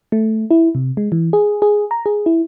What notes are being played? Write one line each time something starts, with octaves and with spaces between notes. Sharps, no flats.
A3
E4
C3
G#3
E3
G#4
G#4
A#5
G#4
E4